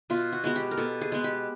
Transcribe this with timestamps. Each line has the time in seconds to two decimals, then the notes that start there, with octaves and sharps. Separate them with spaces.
0.10 B2 F4
0.33 F#4
0.44 G#3 B3 F#4
0.56 G4
0.71 A#4
0.78 B2 A4
1.01 G#4
1.12 G#3 B3
1.24 G4